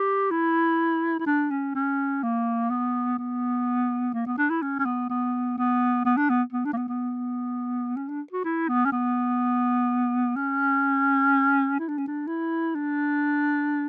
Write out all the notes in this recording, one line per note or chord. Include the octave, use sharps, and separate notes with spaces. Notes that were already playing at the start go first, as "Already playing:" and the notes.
Already playing: G4
E4
E4
D4
C#4
C#4
A#3
B3
B3
A#3
B3
D4
E4
C#4
C#4
B3
B3
B3
B3
D4
B3
B3
D4
A#3
B3
B3
C#4
D4
F#4
E4
B3
C#4
B3
C#4
E4
D4
C#4
D4
E4
D4